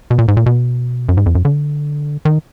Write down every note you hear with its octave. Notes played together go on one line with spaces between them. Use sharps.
B2
A#2
G#2
A#2
B2
F#2
G#2
F2
F#2
D3
D#3